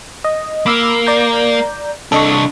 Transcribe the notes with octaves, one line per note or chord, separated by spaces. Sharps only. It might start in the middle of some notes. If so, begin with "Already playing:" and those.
D#5
A#3 B5 D6 E6
D5 A#5 G6
C2 D4 A4 D#5 C#6